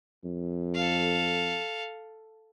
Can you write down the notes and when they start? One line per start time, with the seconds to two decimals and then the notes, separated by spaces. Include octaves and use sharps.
0.24 F2
0.75 A4 F5